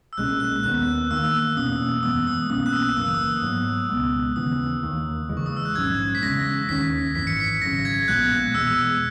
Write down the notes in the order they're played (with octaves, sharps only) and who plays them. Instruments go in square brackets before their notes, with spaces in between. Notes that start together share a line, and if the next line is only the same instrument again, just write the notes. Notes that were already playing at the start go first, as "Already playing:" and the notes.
[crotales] E6
[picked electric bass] B1 A#2 G#3 C#4 [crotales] F#6
[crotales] F#6
[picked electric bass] D#2 D#3 F#3 B3 [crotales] F#6
[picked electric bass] E2 D#3 A#3 [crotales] E6
[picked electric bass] E2 B2 A#3 C#4 [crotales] D#6
[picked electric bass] F#2 E3 G#3 B3 [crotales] D#6
[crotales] D#6
[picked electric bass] B1 B2 A#3 C#4 [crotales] D#6
[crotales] F#6
E6
[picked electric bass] F#1 F#2 E3 A#3 [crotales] D#6
[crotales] E6
D#6
[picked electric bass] G#2 F#3 B3
C#2 B2 G#3 B3
[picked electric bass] D#2 C#3 E3 B3 [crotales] D#6
[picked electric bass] D#2 D#3 A#3
E2 C#3 E3 G#3
[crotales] C#6
D#6
E6
F#6
[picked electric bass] A#1 G#2 F#3 C#4 [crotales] G#6
[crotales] B6
[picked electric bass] E2 C#3 G#3 C#4 [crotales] A#6
[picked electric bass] D#2 D#3 G#3 C#4 [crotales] B6
[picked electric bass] G#1 F#2 E3 [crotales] B6
[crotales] C#7
B6
[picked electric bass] G#1 F#2 C#3 [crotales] A#6
[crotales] G#6
[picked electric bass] A#1 A#2 G#3 B3 [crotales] F#6
[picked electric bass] E2 B2 G#3 [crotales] E6